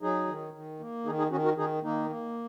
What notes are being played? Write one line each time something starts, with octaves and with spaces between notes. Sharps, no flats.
F#3 D#4 G#4
D#3
D#3
A#3
D#3 D#4 G#4
D#4 G#4
D#3 C#4 F#4
F#4 A#4
D#3 D#4 G#4
D#3 A#3 D#4
A#3